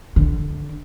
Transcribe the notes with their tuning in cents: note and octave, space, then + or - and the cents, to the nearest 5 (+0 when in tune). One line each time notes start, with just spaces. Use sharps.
D3 -5